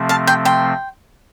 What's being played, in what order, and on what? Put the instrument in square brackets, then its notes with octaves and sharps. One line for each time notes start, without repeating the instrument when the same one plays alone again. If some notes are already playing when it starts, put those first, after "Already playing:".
Already playing: [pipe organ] C3 F3 A3 C4
[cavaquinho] F5 A5
G5 C6
G5 C6